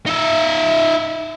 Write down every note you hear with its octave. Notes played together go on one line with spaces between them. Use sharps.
D#4 E5